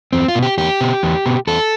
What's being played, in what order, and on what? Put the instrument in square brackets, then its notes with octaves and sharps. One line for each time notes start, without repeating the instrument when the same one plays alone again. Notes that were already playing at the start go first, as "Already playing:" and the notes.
[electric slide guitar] E2 C4
F4
B2
G4
E2 G4
B2
E2
B2
E2 A4